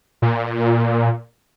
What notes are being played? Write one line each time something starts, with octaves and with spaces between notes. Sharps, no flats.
A#2